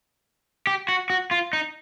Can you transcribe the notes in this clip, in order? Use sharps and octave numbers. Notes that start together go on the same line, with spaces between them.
G4
F#4
F#4
F4
D#4